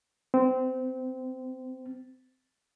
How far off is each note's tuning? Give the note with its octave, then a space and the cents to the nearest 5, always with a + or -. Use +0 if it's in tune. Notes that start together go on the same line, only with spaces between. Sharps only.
C4 -20